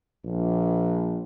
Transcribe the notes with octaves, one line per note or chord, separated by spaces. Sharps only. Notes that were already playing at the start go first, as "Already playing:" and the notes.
A#1